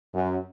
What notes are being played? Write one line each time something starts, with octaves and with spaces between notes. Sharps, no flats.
F#2